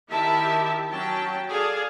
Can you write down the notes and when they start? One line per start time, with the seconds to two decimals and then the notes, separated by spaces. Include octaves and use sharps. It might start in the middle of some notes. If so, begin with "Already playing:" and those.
0.10 D#3 E4 G4 E5 A5
0.90 F#3 C#4 G5 A5
1.49 G#4 A4 D5 F5 A5